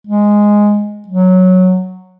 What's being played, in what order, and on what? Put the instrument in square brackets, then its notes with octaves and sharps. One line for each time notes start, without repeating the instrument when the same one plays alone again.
[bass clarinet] G#3
F#3